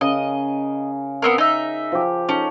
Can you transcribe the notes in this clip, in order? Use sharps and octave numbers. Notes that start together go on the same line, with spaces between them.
C#3 G#4 A#4 D#5
B3 C4 A#4
D#4 E5
F3 G4
C#4 D#4 A4